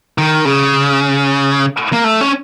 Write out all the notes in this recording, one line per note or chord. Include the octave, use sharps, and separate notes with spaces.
D#3
C#3
A#3
A3
C#4